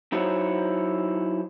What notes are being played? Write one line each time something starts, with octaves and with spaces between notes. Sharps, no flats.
F#3 D#4 E4 F#4 C5 C#5